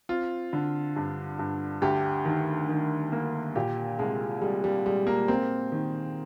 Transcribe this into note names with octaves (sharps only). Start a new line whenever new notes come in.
C4 F4
D3
G2
G2
D2 G4
D#3
D#3
A#3
A#2 G4
C2 G#3
G3 G#3
G3
G3 G#3
A#3
A#3 C4
D#3